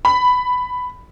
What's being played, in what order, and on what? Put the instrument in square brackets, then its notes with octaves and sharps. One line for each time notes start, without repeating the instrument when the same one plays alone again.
[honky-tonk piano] B5